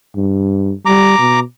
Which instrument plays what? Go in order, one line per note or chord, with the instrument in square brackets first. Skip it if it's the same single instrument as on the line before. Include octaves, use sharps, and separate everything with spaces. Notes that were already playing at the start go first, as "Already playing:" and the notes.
[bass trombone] G2
[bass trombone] G3 [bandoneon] A#5 D6
[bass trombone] B2